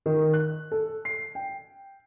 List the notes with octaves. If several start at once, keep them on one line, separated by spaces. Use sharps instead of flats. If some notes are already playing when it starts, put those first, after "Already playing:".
D#3
F#6
A4
C7
G5